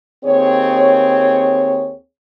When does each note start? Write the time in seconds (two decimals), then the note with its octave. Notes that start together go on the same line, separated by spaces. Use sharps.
0.24 D#2 C4 G#4 C#5